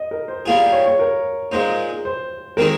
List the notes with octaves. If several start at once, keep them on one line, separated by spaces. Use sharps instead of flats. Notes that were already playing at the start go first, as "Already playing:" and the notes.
Already playing: D#5
A#4
C5
G3 A#3 F4 G#4
F5
C#5
C#5
A#4
A#2 G#3 D#4 C5
C5
D#3 G#3 C4 D#4 G#4 A#4